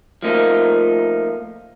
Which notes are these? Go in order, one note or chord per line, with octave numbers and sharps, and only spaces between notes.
F3 A3 A#3 D#4 F4